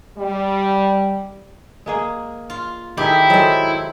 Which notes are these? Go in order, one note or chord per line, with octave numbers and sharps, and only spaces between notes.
G3
G#3 A#3 G#4
F4
D#3 G#3 E4 G4 A4
F#3 G#3 A4 C5 E5